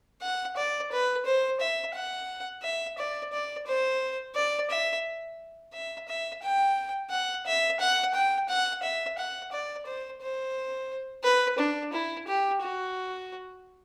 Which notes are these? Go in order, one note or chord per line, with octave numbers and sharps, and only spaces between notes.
F#5
D5
B4
C5
E5
F#5
E5
D5
D5
C5
D5
E5
E5
E5
G5
F#5
E5
F#5
G5
F#5
E5
F#5
D5
C5
C5
B4
D4
E4
G4
F#4